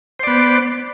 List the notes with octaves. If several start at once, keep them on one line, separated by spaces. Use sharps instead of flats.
B3 C5 D5